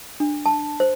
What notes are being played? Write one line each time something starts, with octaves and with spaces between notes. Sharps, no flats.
D4
A5
C5